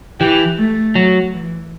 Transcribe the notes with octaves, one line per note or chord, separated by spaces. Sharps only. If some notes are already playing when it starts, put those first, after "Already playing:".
E3 G4
A3
F#3
E3